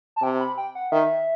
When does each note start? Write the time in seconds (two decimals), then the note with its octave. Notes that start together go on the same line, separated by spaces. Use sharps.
0.16 A5
0.22 C3 G5
0.40 B5
0.58 G5
0.75 F#5
0.92 D#3 E5